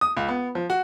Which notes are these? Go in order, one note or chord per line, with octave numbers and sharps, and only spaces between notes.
D#6
C#2
B3
F3
F#4